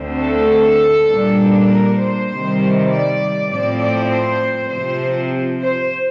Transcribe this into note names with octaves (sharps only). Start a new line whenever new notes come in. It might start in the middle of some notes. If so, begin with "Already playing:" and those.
Already playing: D2 D3 A3 C4
A4
A#2 G3 A#3 D4
A#4
C5
C3 D#3 G3
D5
A2 F3 C4 D5
D5
C5
C3 F3 C4 C5
C5